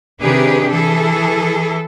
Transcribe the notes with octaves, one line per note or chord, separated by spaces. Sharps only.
C3 D#3 D4 G4 G#4 B4
E3 G#4 A4